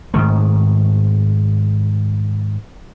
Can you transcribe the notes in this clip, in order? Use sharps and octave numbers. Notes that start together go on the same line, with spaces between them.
G#2 D#3 A3